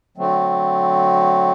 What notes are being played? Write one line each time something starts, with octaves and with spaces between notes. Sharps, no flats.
D3 F#3 A3 C4